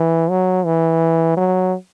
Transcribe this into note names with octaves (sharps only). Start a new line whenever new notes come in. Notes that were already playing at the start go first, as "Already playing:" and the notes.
Already playing: E3
F#3
E3
F#3